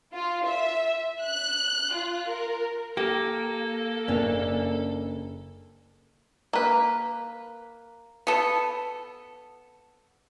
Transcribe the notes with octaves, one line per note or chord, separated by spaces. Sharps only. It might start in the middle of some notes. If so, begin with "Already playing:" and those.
F4
E5
F#6
F4
A#4
A#3 G4 A4
F#1 C#4 D4
A#3 B4
B3 A4